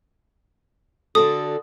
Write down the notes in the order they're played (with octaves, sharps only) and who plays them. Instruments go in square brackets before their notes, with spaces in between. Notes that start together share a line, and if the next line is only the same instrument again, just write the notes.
[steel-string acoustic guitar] D3 F#4 A4 [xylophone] D#6